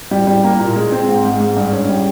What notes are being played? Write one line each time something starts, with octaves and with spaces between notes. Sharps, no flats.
G3
G3
A#3
A#2
G#3
C4
G#2
G#2
G#2
G2
C#4
G3